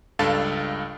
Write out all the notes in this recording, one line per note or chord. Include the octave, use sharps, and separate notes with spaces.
C#2 G2 D4 A4 F5 A6